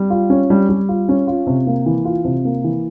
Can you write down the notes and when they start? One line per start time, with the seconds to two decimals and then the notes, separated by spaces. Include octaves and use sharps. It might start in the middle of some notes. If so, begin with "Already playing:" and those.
Already playing: G3
0.10 F4
0.30 C#4
0.50 G3
0.69 G3
0.89 F4
1.09 C#4
1.27 F4
1.47 C3
1.67 A#3
1.86 E3
2.05 F4
2.25 C3
2.45 A#3
2.64 E3